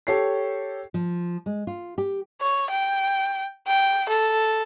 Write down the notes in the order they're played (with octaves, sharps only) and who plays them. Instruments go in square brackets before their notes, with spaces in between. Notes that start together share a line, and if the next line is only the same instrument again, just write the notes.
[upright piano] G4 A4 C#5 C7
[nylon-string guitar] F3
G#3
F4
G4
[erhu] C#5
G5
G5
A4